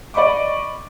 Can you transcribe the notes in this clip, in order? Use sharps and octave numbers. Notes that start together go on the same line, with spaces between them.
D5 D#5 B5 C#6 D6